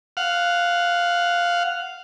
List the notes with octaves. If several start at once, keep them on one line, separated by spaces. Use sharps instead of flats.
F5 F#5